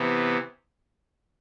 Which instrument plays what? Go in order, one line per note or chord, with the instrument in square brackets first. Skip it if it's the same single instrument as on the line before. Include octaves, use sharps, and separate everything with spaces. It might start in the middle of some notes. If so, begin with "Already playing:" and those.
Already playing: [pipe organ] C3 E3 B3